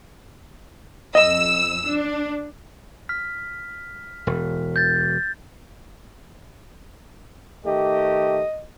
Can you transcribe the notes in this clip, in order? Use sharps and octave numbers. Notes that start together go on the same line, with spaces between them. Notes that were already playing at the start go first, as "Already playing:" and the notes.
F2 D#5 E6
D4
F6 B6
E1
G6 A6
D#3 A3 G4 D#5